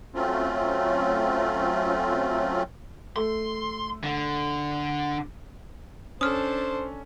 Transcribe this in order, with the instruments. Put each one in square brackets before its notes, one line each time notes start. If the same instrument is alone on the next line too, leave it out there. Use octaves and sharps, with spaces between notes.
[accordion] F#3 A3 C4 C#4 F4
[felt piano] A3 [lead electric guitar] C6
[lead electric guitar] D3
[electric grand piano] C#4 [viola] D4 A4 [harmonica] C5 [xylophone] D#6 F6